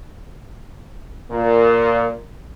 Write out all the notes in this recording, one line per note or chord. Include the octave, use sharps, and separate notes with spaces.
A#2